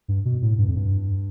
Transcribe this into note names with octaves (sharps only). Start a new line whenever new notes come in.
G2
B2
A2
G2
F2
G2